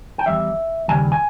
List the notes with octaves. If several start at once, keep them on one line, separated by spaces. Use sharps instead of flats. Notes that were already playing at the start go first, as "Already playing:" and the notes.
G5
E2 D#3 G3 E5
D#2 C#3 G3 G#5
G#5